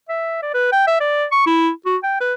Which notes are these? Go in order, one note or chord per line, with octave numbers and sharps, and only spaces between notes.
E5
D5
B4
G5
E5
D5
C#6
E4
F#4
G5
B4